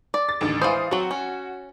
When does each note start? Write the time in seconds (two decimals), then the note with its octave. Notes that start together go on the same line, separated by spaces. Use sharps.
0.14 D5
0.29 A6
0.41 A1 D#2 D3
0.62 E3 G#3 C5 F5 D#6
0.91 F#3 C4 F#4
1.11 C#4